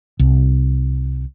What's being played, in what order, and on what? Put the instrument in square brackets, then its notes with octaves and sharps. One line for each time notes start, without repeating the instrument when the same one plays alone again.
[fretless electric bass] C2